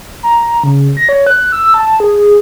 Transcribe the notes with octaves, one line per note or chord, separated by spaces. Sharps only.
A#5
C#3
A#6
C#5
F#6
E6
A5
G#4